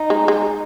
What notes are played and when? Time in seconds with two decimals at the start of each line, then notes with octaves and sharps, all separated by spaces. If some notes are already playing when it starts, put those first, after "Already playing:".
Already playing: D#4
0.10 G#3
0.28 G#3